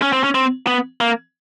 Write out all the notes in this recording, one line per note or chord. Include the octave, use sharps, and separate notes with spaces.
C#4
C4
C#4
C4
B3
A#3